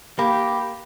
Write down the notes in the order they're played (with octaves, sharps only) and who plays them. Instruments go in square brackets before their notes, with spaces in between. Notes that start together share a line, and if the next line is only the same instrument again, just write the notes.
[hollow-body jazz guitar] A#3 [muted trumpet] G4 [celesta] B5